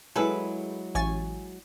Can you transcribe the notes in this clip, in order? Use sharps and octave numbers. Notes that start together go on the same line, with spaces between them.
F#3 G#3 E4 G#4 A4 B4
A1 G#5 C#6 A6